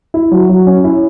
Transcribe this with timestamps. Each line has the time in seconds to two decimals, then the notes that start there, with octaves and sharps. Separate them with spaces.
0.14 E4
0.31 F#3
0.49 F#3
0.67 C#4
0.84 E4